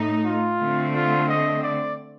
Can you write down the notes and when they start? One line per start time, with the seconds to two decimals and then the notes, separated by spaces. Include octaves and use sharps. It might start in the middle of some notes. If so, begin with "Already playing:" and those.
Already playing: A2 A3 D#4
0.25 F4
0.60 D3 A3 C4
0.94 F4
1.29 D#5
1.63 D5